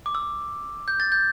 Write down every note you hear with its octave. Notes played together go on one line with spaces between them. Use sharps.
D6
E6
G6
A6
G6